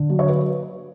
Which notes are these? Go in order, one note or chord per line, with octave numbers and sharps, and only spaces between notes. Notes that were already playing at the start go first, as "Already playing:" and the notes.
Already playing: D3
F#3
C#5
B4